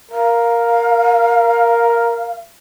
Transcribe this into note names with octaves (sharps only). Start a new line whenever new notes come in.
A#4 F5